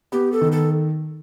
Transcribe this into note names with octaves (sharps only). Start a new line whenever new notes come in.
B3 G4
A4
D#3
A4